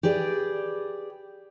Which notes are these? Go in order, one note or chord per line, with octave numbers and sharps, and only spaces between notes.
G4 G#4 B4 D5